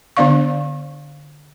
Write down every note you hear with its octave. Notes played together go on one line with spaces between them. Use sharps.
D3 B3 D4 D5 F5 C#6